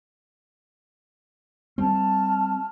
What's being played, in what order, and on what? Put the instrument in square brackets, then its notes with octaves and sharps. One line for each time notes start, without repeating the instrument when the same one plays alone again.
[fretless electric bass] G3 C4 [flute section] A5 F6